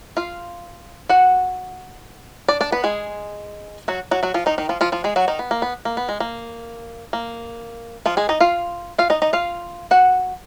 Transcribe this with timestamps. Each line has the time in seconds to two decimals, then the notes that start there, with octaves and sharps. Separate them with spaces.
0.17 F4 F5
1.09 F#4 F#5
2.48 D4 D5
2.61 D4 D5
2.72 B3 B4
2.84 G#3 G#4
3.88 F#3 F#4
4.11 F#3 F#4
4.23 F#3 F#4
4.34 F3 F4
4.46 D#3 D#4
4.58 D#3 D#4
4.69 F3 F4
4.81 F3 F4
4.92 F3 F4
5.04 G#3 G#4
5.16 F#3 F#4
5.28 D#3 D#4
5.39 B3
5.51 A#3
5.62 B3
5.85 A#3
5.97 B3
6.09 G#3
6.20 A#3
7.13 A#3
8.06 F3 F4
8.17 G#3 G#4
8.29 D#4 D#5
8.40 F4 F5
8.98 F4 F5
9.10 D#4 D#5
9.22 D#4 D#5
9.33 F4 F5
9.91 F#4 F#5